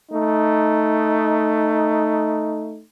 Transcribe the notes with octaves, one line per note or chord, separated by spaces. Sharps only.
A3 D#4